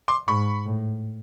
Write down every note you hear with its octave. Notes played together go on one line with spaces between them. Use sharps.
C6 D6
G#2 B5 C#6
A2